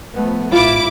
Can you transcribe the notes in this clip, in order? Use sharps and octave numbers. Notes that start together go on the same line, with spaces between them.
F3 A3 B3
A1 G#2 E4 F4 D6